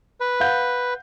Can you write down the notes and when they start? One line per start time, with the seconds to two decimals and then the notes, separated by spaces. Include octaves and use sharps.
0.20 B4
0.40 F5 F#5 G6